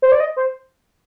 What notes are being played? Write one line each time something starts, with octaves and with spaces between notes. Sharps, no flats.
C5
D5
D#5
C5